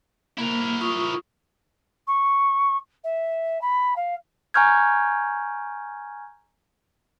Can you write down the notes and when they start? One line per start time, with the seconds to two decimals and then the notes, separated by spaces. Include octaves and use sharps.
0.38 A#3 E4 A#4
0.81 F4 C#6 D#6
2.07 C#6
3.03 E5
3.61 B5
3.96 F5
4.54 G#5 A#5 C#6 F6 G6 G#6